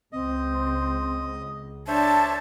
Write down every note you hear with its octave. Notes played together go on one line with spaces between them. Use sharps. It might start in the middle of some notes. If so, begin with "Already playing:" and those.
C#2 C4 D#5
D4 C5 C#5 E5 A5